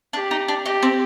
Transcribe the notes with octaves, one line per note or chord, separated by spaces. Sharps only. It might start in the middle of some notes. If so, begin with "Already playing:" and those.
D4 G4
D#4
D4
D#4 G4
C4